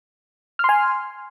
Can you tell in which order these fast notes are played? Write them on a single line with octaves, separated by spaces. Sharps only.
F6 C6 G#5